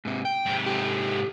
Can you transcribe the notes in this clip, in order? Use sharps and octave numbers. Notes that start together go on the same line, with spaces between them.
G#2 C3
G5
G#2 C3
G4 A4